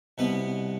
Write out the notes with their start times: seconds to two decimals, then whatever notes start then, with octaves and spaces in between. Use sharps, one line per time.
0.18 C2 B2 B3 B4